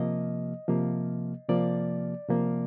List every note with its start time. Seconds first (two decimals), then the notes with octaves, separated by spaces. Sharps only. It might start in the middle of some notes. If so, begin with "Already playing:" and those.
Already playing: C3 F3 A#3 D#5
0.68 C3 F3 A#3
1.48 C3 F3 A#3 D5
2.29 C3 F3 A#3